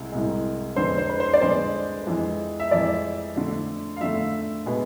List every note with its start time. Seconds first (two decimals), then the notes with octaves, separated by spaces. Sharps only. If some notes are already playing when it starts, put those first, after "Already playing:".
Already playing: C2 C3 G#3
0.12 C2 C3 G#3
0.76 F2 D3 G#3 B3 D4 C5
0.98 C5
1.09 B4
1.20 C5
1.34 D5
1.41 F2 D3 G#3 B3 D4 C5
2.07 F2 E3 G#3
2.60 E5
2.71 F2 E3 G#3 D5
3.36 F2 D3 A3
3.97 F5
4.01 F2 D3 A3 E5
4.66 B2 G#3 B3